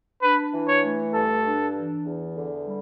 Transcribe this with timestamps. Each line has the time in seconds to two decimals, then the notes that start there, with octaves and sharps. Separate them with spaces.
0.22 D4 B4
0.53 E3
0.68 C#5
0.83 A3
1.14 G2 A4
1.44 D4
1.75 E3
2.05 E2
2.35 D3
2.66 G3